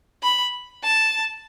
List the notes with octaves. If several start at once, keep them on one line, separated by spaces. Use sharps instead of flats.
B5
A5